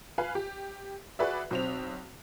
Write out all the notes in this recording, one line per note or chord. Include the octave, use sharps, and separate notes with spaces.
B4 F5 G#5
G4
F#4 G#4 B4 D5 E5
B1 C4 F7